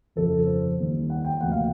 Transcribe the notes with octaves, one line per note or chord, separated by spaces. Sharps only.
F2 C#3 F3 A4
C5
D#2 D#3 G3
F#5
G5
D2 C3 F3 A#3 F#5
F5